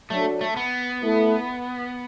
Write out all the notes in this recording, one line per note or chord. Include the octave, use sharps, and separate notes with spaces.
F#3 A3 D4 A4
A3
B3
A3 E4 A4